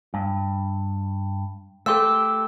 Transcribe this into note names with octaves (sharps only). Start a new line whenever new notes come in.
G2
A3 G4 A4 C6 E6